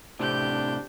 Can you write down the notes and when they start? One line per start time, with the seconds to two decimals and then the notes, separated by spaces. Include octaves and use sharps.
0.19 A2 C3 C4 D4 G4 G6